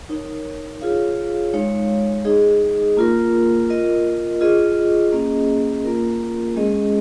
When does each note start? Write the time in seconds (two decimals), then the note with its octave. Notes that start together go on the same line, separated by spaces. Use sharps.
0.09 D#4 A#4 C#5
0.82 F4 G#4 C#5 F5
1.53 G#3 D#4 C#5 F5
2.25 D#4 G#4 D#5
2.97 A#3 F4 A#4
3.69 F4 A#4 D#5
4.41 F4 G#4 D#5
5.12 A#3 C#4 G#4 D#5
5.84 A#3 F4 A#4
6.56 G#3 C#4 G#4 D#5